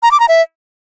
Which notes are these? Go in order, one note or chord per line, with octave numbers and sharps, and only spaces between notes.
A#5
D6
A#5
E5